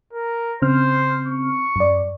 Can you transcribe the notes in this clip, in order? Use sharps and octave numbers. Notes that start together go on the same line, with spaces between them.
A#4
C#3 C4 C5 F6
C#6
F#2 D5